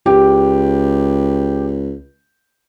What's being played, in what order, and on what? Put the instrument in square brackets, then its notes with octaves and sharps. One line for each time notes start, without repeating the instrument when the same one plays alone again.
[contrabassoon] C#2 [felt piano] G4